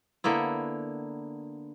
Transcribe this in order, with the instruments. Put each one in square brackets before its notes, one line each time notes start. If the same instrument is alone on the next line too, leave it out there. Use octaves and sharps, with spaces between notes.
[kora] D3 A#3 B3 E4